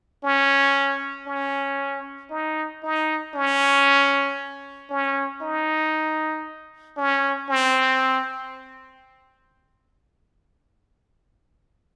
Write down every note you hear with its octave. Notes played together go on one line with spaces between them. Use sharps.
C#4
C#4
D#4
D#4
C#4
C#4
D#4
C#4
C4